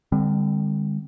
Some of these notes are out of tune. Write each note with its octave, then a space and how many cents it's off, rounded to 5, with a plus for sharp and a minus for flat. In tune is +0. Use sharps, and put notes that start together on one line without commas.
D3 +25 G3 +45 C4 +0